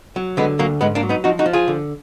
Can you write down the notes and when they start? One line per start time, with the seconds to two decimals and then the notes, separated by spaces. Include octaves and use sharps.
0.16 F#3
0.37 D3 G#3 B3
0.59 D2 F#3 A#3
0.81 G#2 G#3 B3
0.95 A#3 D4
1.03 F#3
1.09 B3 D#4
1.24 F3 D#4 F#4
1.39 D#4 F#4
1.46 F3
1.53 F4 G#4
1.68 D3